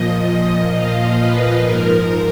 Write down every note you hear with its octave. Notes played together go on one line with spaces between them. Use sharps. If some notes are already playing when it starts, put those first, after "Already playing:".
Already playing: A#2 F3 D#5
F5
B4
G#2 F3 A#4